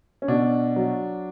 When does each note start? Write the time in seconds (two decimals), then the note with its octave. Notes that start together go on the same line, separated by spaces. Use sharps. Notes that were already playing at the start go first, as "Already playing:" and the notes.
0.22 C#4
0.28 B2 D4
0.76 F#3